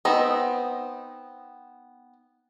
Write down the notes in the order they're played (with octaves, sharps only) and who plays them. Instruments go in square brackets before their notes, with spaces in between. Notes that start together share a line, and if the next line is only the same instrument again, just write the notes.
[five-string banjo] B3 C4 D#4